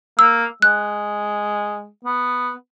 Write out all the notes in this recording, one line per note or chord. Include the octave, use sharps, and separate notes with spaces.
A#3 E6
G#3 F#6
B3